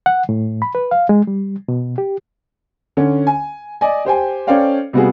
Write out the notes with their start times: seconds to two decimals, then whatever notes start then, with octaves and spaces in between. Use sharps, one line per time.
0.06 F#5
0.29 A2
0.62 B5
0.75 B4
0.91 F5
1.09 G#3
1.27 G3
1.68 B2
1.98 G4
2.97 D3 C#4
3.27 G#5
3.81 D5 D#5 G#5
4.05 G4 C5 G5 G#5
4.47 C#4 A4 C5 D5 F5 G5
4.93 C3 G3 B3 F4 F#4 G#4